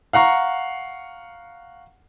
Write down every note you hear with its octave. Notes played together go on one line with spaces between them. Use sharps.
F5 F#5 A#5 C#6